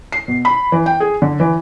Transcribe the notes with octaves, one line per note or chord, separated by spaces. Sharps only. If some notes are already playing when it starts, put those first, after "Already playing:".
C7
B2
B5
E3
G5
G#4
D3
E3